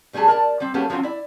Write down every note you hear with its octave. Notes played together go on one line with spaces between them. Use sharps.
B2 G3 A3 G#4 A5
A#4 D5 A5
G3 C4
F#3 A#3 B3 C#4 G4 A4
F3 F#3 A3 C4 C#4
E4 D5